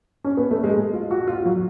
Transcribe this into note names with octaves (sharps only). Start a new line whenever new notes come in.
C#4
B3
A3
G#3
F4
F#4
F4
F#3